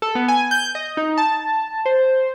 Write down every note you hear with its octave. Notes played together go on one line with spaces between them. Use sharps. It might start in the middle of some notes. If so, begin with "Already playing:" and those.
A4
B3
G#5
G6
D#5
D#4
A5
C5